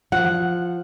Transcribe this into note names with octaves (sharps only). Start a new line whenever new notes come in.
F3 F#5